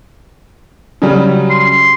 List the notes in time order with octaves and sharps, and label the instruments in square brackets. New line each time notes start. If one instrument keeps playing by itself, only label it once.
[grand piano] C#3 F#3 G3
[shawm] C6